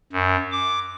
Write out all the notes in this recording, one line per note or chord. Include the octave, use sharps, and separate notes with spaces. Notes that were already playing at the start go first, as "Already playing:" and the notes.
F#2
D6